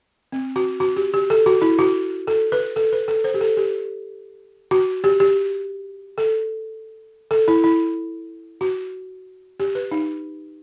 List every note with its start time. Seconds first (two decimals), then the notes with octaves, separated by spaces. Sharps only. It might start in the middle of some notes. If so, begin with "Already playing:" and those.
0.32 C4
0.56 F#4
0.80 F#4
0.96 G4
1.14 G4
1.30 A4
1.46 F#4
1.62 E4
1.79 F#4
2.27 A4
2.52 B4
2.76 A4
2.92 B4
3.08 A4
3.24 C5
3.34 G4
3.41 A4
3.57 G4
4.71 F#4
5.04 G4
5.20 G4
6.18 A4
7.31 A4
7.48 E4
7.64 E4
8.61 F#4
9.60 G4
9.75 B4
9.91 D#4